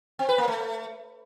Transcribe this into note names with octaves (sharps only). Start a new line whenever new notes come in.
C4
B4
A#3
A3